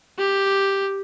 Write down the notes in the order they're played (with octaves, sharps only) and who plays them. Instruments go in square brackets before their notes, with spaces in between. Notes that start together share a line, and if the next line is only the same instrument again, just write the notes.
[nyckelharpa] G4